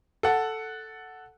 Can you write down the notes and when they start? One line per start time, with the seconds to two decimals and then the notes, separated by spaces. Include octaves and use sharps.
0.23 A4 F#5